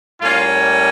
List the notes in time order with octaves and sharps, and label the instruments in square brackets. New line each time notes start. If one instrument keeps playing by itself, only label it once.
[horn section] A2 G3 A#3 C#4 F4